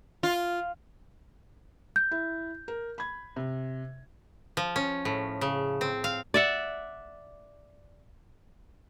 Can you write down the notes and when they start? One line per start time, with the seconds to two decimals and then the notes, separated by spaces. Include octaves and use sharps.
0.23 F4
1.96 G6
2.11 E4
2.68 A#4
2.98 B5 G#6
3.36 C3
4.57 F3
4.76 C#4
5.05 A2
5.41 C#3
5.81 C4
6.04 F5
6.34 D5 E5 F#5